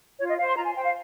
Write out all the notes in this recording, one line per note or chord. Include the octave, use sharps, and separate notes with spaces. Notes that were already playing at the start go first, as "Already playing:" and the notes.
F4 C#5
D#5
C5 F5
C6
F4 A#5
G#5
C5 G5
F5